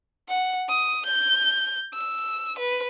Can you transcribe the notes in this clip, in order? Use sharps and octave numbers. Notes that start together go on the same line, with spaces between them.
F#5
D#6
G6
E6
B4